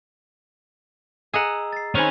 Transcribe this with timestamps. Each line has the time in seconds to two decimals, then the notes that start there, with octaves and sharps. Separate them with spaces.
1.34 G#4 D#5 F#5 A#5 E6
1.73 A6 C7
1.95 D#3 C4 C#4 G#5 B5 F6 F#6